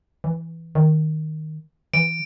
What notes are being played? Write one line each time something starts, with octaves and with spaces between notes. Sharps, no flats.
E3
D#3
E3 D7